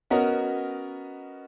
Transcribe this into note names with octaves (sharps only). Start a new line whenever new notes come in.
B3 C#4 F#4 A#4 D#5